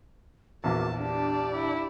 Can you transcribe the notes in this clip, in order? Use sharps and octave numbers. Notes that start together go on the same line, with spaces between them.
A#1 E2 F#4 A#4 A5 D6
D4 G4 D5 A5
E4